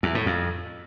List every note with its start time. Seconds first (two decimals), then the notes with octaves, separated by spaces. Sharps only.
0.03 E2
0.15 A2
0.26 F2